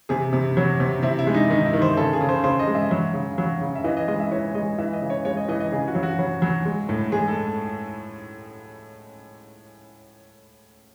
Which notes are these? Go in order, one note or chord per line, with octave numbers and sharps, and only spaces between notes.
C3 G#4
C3
F#3
C3
C3 E4
E4
G#3
D#4
D#3 D#4
E4
D#3
C5
C#3 A4
G#4
C#3
C5
C#3 C5
D#5
G#3
E5
F#3
C#3
F#3
C#3
E5
E3 D#5
D#5
G#3 D#5
E5
E3 C#5
G#3 D#5
E3 E5
D#5
C#3
C#5
G#3 C#5
D#5
E3 D#5
D#5
C#3 G#4
F#4
F#3
F#4
F#3
F#3
G#3
A2
G#3 G#4
A4